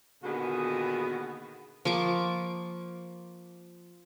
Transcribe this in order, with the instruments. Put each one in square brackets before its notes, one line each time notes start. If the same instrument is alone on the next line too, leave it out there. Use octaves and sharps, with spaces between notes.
[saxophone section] A#2 D3 D#3 B3 F#4 G#4
[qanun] F3 A#3 C#6 D6